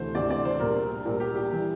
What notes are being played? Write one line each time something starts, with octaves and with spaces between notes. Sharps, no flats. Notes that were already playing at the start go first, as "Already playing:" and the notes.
Already playing: D2 C3 E3 A3 C5
D2 C3 E3 A3 D5
D5
C5
A#1 A#2 G3 A#4
A#1 A#2 G3
G4
G4
E3 G3